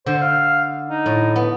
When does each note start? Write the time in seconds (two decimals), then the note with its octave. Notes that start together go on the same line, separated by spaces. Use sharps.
0.06 D3 C5
0.21 F5
0.89 D#4
1.06 A2
1.36 B3